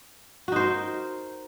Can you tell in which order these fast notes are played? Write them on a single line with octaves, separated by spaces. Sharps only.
F#4 D#4 C5 A#4